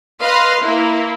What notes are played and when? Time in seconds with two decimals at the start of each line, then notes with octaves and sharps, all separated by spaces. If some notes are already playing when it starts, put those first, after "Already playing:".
0.22 B4 D#5 F5 C6
0.62 A#3 E4